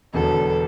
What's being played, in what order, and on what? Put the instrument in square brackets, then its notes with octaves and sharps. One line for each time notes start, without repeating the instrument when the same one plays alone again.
[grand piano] E1 E2 D3 F#3 B3 [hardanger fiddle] A4